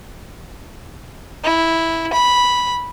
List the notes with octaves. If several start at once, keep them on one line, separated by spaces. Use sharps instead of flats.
E4
B5